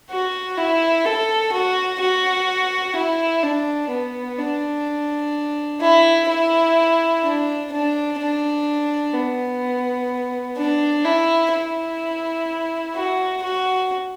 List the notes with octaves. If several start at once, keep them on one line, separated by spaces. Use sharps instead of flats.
F#4
E4
A4
F#4
F#4
E4
D4
B3
D4
E4
E4
D4
D4
D4
B3
D4
E4
E4
F#4
F#4